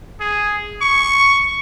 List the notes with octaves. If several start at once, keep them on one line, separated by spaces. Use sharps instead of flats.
G#4
C#6